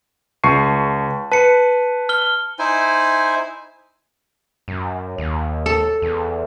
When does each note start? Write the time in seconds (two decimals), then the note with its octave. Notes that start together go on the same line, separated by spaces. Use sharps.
0.44 C#2 A5 C#6 C7
1.32 B4 A5 C#7
2.09 F6 G7
2.59 D#4 E4 C5 G#5
4.68 F#2
5.18 D#2
5.66 A4
6.02 E2